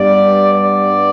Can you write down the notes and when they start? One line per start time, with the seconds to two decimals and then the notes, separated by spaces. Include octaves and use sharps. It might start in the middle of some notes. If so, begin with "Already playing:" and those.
Already playing: G2 G3 B3 D5
0.53 D5